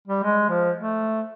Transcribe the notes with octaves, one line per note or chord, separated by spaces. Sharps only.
G3
G#3
F3
A3